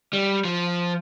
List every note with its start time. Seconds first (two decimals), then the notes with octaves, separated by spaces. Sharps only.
0.13 G3
0.45 F3